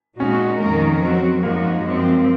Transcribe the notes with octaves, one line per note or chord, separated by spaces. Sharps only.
A#2 G#3 C#4 D#4 F#4
F2 D#3 A#3 D#4 A#4
F#3 C4 F#4
F#2 F3 G#3 A#3 D#4 F#4
F#2 F3 C4